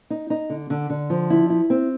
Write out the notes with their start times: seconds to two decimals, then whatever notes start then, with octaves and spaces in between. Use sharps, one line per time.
0.10 D#4
0.30 D#4
0.50 D3
0.70 D3
0.90 D3
1.10 F3
1.30 E4
1.50 E4
1.70 C4